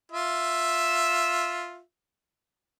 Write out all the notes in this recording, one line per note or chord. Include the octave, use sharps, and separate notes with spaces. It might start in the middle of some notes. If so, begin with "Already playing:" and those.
F4 E5